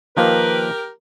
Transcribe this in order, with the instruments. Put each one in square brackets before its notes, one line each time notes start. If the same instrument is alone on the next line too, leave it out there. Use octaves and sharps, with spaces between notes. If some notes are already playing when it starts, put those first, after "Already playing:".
[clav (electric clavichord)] D#3 F3 A#3 [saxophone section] G4 A#4 [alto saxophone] B4